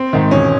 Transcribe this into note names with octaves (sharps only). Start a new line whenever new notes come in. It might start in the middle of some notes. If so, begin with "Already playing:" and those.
Already playing: C4
G#2 D#3
E1 C#4